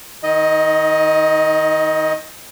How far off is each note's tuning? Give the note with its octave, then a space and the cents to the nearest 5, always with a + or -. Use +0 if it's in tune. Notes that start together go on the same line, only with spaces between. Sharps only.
D#3 +0 D#4 +35 D#5 +0